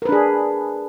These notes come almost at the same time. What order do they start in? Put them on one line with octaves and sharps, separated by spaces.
A#4 B4 D4 G#4